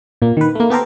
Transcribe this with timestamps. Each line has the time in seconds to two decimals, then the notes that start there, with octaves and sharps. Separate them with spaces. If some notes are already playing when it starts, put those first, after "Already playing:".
0.22 A#2 A#3
0.37 D#3 B4
0.55 A3 A#3
0.70 B3 G4 A4 A#4 C5